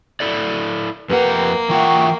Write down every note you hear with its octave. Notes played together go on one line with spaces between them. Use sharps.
E4 A4 D5
F2 A#3 G4 B4 F#5
E3 F4 E5 F#5 G5 C#6